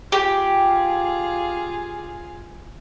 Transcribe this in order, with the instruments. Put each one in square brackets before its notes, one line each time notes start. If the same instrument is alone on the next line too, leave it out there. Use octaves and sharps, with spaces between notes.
[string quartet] F4 G#4 F5 [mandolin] G4